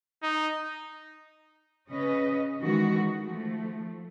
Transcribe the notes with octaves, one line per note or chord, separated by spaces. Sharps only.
D#4
C#3 C#4 B4 D#5
D#3 E3 G#3 F#4
F3 A3